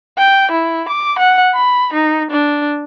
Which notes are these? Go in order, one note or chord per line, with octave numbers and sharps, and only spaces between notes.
G5
E4
D6
F#5
B5
D#4
D4